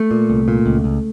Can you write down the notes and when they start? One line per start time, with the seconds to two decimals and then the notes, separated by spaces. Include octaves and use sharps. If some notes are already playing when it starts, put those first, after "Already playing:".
Already playing: A3
0.11 A#2
0.30 C2
0.48 A#2
0.66 C#2
0.84 C#2